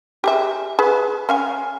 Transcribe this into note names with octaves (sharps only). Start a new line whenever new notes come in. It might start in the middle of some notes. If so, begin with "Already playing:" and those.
G4 G#4 E5
G#4 B4
C#4 F5 G#5